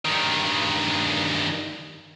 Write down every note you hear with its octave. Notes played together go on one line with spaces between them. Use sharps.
G2 D#3